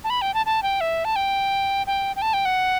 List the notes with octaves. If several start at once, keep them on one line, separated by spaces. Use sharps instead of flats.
A5
B5
G5
A5
A5
G5
E5
A5
G5
G5
G5
A5
G5
F#5